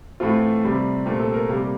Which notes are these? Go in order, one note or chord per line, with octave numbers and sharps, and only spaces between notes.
A2 E3 A3 C4 F4
C3 G3 C4
A#2 A3 C4 G4
A4
A#4
C3 G3 A#3 G4